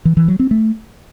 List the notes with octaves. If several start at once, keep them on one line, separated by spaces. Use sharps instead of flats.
E3
E3
F#3
C4
A3